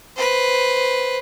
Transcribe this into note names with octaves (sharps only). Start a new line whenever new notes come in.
B4 C5